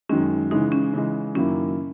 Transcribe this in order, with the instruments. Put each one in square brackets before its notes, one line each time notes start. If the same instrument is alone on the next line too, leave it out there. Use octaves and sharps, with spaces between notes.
[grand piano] F#2 D#3 G#3 [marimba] C#4
[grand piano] C#3 E3 G#3 [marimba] D#4
[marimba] C#4
[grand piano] C#3 E3 G#3
[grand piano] F#2 D#3 A#3 E4 [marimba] C#4